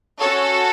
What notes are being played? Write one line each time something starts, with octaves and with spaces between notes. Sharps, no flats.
C#4 F#4 A4 C#5